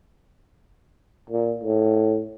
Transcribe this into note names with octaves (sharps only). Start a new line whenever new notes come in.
A#2
A2